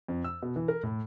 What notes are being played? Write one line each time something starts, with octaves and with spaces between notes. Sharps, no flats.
F2
E6
B2
E3
A#4
A2